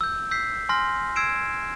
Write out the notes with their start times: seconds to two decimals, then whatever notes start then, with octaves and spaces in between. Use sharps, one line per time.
0.01 E6 G6
0.31 E6 G6 B6 C7
0.69 G#5 C6 F6 A#6
1.16 E6 G#6 C7 D7 E7